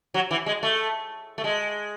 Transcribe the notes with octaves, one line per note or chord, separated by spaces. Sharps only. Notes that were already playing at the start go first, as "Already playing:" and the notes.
F#3
E3
G#3
A3
A3
G#3